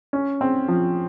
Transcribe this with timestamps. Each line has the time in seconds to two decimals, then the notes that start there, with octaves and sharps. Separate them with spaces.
0.13 C#4
0.41 C4
0.68 F3